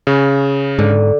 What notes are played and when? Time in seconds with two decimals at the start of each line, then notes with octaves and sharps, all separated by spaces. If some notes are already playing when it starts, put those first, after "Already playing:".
0.07 C#3
0.79 G#2 D3